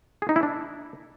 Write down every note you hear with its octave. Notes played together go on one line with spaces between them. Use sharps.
G#4
D#4
E4
D4